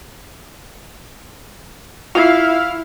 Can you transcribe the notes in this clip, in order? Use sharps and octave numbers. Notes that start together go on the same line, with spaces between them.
E4 F4 F5